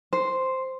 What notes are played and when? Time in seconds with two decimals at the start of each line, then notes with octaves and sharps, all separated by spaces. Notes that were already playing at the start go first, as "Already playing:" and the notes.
0.13 C5